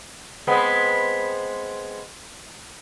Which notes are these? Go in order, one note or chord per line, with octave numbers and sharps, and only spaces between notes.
G#3 B3 C4